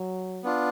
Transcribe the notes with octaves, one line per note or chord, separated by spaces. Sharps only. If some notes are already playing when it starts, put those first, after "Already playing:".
Already playing: F#3
B3 D4 F4